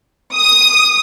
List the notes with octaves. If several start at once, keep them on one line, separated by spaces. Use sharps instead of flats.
D#6